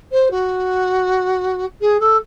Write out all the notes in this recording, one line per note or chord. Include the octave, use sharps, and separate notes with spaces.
C5
F#4
G#4
A4